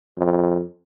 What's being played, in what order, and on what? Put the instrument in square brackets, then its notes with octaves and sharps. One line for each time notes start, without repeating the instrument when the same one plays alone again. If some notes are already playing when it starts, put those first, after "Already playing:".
[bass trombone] F2